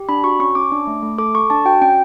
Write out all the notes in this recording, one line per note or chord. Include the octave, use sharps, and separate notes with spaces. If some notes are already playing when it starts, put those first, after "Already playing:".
Already playing: G4
D4 B5
F#4 C#6
C#4 C#6
C#4 D6
D4
A3
A3
A4 D6
A4 C#6
D4 A5
F#4 G5
C#4 G5